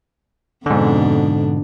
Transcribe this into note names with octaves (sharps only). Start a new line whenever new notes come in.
F2 G#2 B2 D3 D4